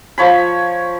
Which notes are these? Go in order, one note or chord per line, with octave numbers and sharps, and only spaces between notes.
F3 C#5 B5